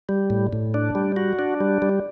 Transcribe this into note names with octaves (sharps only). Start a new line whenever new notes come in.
G3
A2
A2
D4
G3
F#4
D4
G3
G3